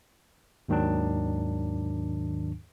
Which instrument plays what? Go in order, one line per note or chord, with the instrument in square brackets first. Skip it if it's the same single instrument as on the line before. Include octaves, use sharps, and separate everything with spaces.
[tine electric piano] D#2 G#2 D#3 F#3 D4